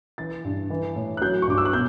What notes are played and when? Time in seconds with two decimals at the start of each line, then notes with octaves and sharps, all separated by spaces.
0.18 E3 A6
0.45 G2
0.70 E3
0.96 A2
1.17 F#6
1.21 F#3 G6
1.42 C#6
1.47 G2 D6
1.58 E6
1.65 F#6
1.73 B2 G6